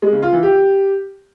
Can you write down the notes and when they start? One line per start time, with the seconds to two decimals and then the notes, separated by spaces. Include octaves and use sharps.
0.02 G#3
0.12 C#3
0.22 F4
0.33 E3
0.43 G4